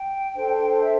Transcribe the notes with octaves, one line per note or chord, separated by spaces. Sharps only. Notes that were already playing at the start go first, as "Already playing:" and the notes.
Already playing: G5
D4 A4 C5
E5